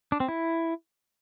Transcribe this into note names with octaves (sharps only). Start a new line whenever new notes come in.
D4
C4
E4